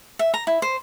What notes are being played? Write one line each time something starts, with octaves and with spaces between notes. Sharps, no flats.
E5
A#5
E4
C5